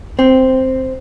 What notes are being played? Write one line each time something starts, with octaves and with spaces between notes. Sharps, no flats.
C4